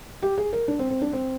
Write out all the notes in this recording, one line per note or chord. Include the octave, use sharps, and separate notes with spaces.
G4
G#4
A#4
D4
C4
C4
D4
C4